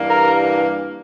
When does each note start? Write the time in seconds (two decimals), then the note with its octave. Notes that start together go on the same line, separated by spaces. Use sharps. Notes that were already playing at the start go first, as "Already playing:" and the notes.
Already playing: G2 E3 G3 A#3
0.10 A#4